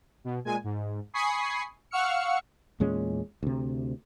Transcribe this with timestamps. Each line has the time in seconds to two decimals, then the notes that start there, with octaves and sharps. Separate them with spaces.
0.24 B2
0.45 A#2 G#3 G#5
0.64 G#2
1.14 G#5 B5 C#6 D#6 C7
1.91 F5 F#5 C#6 E6 F6 C#7
2.80 E2 A#2 G#3 C#4
3.43 D2 C3